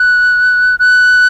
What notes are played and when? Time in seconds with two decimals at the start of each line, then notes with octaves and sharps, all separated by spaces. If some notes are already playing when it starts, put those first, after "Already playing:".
Already playing: F#6
0.79 F#6